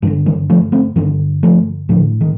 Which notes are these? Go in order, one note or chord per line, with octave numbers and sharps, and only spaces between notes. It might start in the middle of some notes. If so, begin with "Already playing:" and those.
G2 D3 D#3 G3
D#3 G3
F3 A3
A3 C4
G2 D3 D#3 G3
F3 A3
A2 D3 F3
D#3